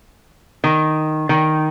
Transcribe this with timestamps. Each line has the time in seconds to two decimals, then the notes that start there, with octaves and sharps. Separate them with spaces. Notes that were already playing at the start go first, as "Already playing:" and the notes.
0.64 D#3
1.29 D#3